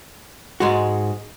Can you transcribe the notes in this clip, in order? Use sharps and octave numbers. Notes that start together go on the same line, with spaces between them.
G#2 G#3 F#4